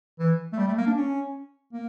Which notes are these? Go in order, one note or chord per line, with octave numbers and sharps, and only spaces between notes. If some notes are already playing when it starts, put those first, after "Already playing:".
E3
A3
G3
A3
A#3
D4
C#4
A#3